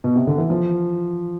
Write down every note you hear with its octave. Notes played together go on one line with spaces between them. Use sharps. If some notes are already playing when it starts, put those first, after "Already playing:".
B2
C3
D3
E3
F3